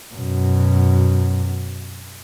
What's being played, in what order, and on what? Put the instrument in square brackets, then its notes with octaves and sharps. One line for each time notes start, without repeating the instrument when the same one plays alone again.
[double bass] F#2 B2